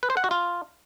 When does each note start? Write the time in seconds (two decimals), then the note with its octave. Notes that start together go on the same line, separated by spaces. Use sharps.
0.03 B4
0.10 C5
0.17 F#5
0.24 F#4
0.31 F4